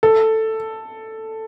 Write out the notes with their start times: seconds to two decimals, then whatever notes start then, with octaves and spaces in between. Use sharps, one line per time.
0.03 A4